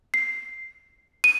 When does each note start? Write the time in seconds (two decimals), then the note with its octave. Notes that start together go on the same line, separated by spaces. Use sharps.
0.14 C7
1.24 D#7